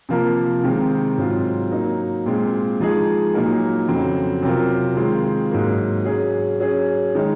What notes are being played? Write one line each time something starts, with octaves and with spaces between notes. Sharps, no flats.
C3 F3 A#3 F4 A#4
C3 D#3 G#3 C4
G#2 F#3 C4 F4
F#3 A#3 D#4
A#2 G#3 C4 F4
F3 G#3 D#4 G#4
A#2 F#3 A#3 D#4 A#4
F2 C#3 F#3 C4
C3 F#3 C4 F4 A#4
D#3 G#3 C4 F4
G#2 F#3 A#3
F#3 C#4 G#4
F#3 C#4 G#4
D#3 G#3 D#4